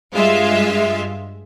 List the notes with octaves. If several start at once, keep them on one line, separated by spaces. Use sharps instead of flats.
G2 G#3 F4 E5